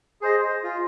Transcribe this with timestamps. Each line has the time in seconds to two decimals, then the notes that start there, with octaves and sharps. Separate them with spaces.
0.21 G#4 C5 D#5
0.63 F4